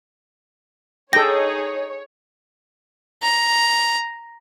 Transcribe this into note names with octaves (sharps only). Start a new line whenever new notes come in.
D#4 G#4 A4 C#5 G5 A#6
A#5